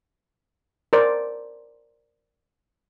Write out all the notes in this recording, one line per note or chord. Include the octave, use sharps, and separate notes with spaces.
A#4 C5 D5